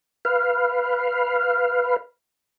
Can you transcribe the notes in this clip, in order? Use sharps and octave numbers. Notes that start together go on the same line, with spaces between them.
B4 F5